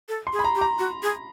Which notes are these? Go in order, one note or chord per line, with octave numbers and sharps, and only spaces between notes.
A4
C6
G#4
B5
A#5
G4
A#5
F#4
G#4